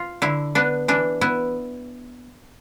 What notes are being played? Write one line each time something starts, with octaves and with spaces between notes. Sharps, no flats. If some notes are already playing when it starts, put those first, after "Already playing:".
Already playing: F4
D3 E4
B3 D4
E3 D4
B3 E4